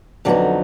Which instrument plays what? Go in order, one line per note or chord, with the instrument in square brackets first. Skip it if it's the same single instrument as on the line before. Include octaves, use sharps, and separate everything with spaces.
[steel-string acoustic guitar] F2 D3 F#3 B3 D#4